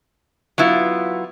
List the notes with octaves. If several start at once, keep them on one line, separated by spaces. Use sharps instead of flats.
F#3 B3 E4 F4